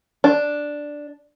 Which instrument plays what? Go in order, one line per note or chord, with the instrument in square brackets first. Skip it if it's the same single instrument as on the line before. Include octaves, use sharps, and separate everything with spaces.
[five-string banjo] D4